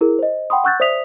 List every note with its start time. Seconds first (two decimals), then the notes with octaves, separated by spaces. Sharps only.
0.01 E4 G#4 A#4
0.19 C5 D#5
0.50 F#5 G5 B5 C6 D#6
0.64 F#5 C#6 E6 F#6 G6 A6
0.80 C5 D5 E5 D#6 B6 F7